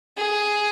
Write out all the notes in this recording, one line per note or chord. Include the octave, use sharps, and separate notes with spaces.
G#4